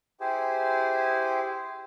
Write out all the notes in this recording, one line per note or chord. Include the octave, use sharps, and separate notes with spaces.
E4 G4 G#4 C5